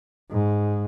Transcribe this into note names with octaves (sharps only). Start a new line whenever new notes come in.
G#2